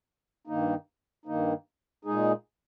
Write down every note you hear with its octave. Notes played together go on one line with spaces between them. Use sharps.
G2 D#3 A#3 D#4
G2 D#3 A#3 D#4
A#2 G#3 D#4 G#4